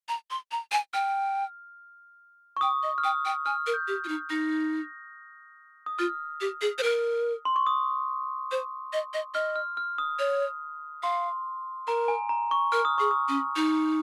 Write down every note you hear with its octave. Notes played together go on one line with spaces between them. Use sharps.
A#5
C6
A#5
G#5
G5 F6
C#6
G5 D#6
D#5
F6
G5 D#6
G5
G#5 F6
A#4
G6
G4
F4
D#4
D#4 A#6
D#6
F4 F6
G4
G#4
C5
A#4
C6
C#6
D#6
C5
D#5
D#5
D#5 F6
F6
F6
D#6
C#5
F5 C6
A#4 A#5
G#5
A#5
C#6
A#4 F6
D#6
G#4 C#6
D#6
C#4
D#4